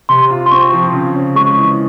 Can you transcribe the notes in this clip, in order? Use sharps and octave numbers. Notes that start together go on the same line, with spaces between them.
C3 C6
F4
C6
C4 C#6
F3
C#3
C#4
G#3 C#6
E3